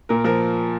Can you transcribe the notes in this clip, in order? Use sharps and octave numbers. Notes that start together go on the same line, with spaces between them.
A#2 A#4
F3 A#4